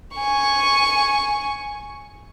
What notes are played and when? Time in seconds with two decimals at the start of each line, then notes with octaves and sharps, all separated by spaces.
0.17 G#5 C#6